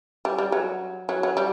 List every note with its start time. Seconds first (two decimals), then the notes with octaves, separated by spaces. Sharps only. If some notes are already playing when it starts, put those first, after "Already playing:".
0.25 G3
0.38 G3
0.52 F#3
1.09 F#3
1.23 F#3
1.37 G3